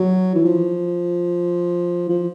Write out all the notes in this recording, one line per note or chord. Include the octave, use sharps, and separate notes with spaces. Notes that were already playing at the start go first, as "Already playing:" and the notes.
Already playing: F#3
E3
F3
F3